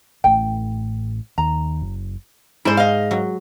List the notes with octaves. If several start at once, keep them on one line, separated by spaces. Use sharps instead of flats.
A1 A2 G5
D#2 A#5
F#1
G#2 E4 C5
D#5 F5
F#3